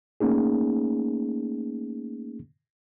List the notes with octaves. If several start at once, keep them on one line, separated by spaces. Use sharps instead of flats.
A3 A#3 C#4 D#4 G#4